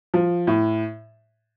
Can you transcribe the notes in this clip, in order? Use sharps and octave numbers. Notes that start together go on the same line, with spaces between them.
F3
A2